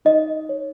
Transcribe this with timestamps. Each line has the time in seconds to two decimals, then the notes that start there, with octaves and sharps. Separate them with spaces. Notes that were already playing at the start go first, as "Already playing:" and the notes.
0.05 D#4 D#5
0.49 C#5